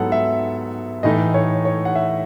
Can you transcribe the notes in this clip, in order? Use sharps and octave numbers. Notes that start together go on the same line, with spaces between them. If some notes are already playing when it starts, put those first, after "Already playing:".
Already playing: G#2 F#3 B3 E4 A4 F#5
E5
A2 E3 A3 D#4 D#5
C#5
C#5
F#5
E5